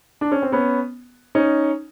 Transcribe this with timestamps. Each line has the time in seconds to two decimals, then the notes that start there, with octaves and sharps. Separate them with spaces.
0.21 D4
0.32 C#4
0.42 C4
0.52 B3 C#4
1.35 C#4 D#4